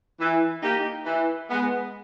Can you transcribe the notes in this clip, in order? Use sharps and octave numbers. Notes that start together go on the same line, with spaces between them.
E3
A#3 D#4 G4
E3
G#3 B3